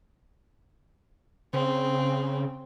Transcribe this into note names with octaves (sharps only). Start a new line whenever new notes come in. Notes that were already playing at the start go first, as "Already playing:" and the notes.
C#3 C4